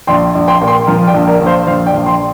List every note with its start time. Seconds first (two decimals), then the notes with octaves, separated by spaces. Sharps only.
0.07 A#1 G5 C6
0.35 A#1
0.48 G5 C6
0.62 A#2
0.68 G5 C6
0.87 F3 A#4
1.07 D5 G5
1.14 A#1
1.27 A#4 D5
1.40 A#1
1.46 C5 F5
1.67 A#1 C5 F5
1.86 D5 G5
1.93 A#1
2.06 G5 C6